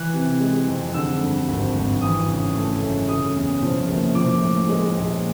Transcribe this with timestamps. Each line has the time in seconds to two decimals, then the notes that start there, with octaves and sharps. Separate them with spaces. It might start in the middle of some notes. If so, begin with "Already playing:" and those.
Already playing: E3 F#6
0.14 C3
0.40 G#3
0.67 F2
0.94 D3 E6
1.21 G2
1.48 G#1
1.74 G#1
2.01 E3 D#6
2.28 C#3
2.55 A3
2.81 F#2
3.08 C#3 D#6
3.36 E2
3.62 F3
3.89 F#1
4.15 F3 D6
4.42 A2
4.69 G#3
4.96 A#1